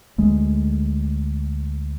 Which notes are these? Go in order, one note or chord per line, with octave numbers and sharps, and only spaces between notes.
D2 G#3 A3